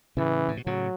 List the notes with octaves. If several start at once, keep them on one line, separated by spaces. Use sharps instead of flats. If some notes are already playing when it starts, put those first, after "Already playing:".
A2 C#3 E3
A2
B2
A2 C#3 F#3